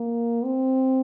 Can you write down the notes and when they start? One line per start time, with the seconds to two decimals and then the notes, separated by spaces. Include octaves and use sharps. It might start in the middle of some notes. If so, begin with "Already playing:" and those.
Already playing: A#3
0.45 C4